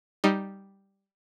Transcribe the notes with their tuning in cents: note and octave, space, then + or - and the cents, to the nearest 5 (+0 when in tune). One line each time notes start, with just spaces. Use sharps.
G3 +0 D#4 +0